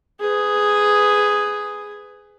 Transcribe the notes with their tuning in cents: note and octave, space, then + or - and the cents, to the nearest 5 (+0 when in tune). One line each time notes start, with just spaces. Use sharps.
G#4 +0 B4 +25